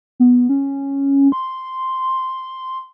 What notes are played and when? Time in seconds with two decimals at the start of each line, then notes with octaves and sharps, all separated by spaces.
0.20 B3
0.49 C#4
1.32 C6